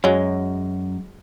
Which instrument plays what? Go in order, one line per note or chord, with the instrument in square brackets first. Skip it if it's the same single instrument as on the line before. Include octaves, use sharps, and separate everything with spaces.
[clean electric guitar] F#2 [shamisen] F#3 G#3